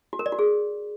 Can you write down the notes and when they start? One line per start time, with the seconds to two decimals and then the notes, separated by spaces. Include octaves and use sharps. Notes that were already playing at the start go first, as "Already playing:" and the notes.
0.13 F#4
0.19 A#4
0.26 D5
0.32 F#4
0.39 G#4